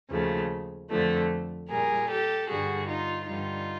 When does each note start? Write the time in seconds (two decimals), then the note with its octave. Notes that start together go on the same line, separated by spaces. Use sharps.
0.10 D#2 C#3 F3 A3
0.91 F2 D3 F3 A3
1.69 A#2 G3 G#4 A#4
2.09 G4 A4
2.48 G2 D3 G3 F#4 G#4
2.87 D#4 F4
3.27 G2 D3 G3 D#4 F4